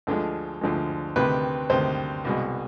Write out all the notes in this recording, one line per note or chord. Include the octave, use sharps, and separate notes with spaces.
D2 D3 F3 G#3
D2 D3 F3 G#3
D2 C3 D#3 B4
D2 C3 D#3 C5
C2 B2 G#3